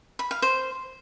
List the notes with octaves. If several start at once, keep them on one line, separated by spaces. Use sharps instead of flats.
B5
F5
C5